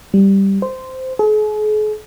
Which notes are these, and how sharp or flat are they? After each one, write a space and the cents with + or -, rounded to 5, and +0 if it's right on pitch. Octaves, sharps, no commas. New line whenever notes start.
G3 +0
C5 -10
G#4 +45